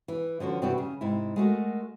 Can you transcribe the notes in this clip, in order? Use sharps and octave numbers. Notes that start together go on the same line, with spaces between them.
E3
D3 F3 C#4 F#4
G2 C3 E3 C4 D4 F#4
C#3
G#2 C3 E4
G#3 A3 F#4 A#4